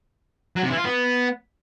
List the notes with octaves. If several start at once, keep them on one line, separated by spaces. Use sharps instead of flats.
F#3
C3
E3
F4
B3